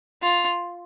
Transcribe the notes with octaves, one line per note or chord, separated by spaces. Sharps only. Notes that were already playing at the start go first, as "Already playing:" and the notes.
F4